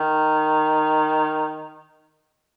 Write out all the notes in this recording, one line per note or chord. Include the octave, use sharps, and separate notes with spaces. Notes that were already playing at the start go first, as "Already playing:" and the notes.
Already playing: D#3